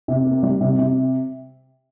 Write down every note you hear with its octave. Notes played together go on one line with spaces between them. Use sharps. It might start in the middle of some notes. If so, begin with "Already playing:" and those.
C3
A#3
G3
C3
C3